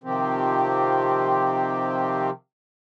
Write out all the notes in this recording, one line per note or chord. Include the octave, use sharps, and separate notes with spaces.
C3 D#3 F3 C4 G4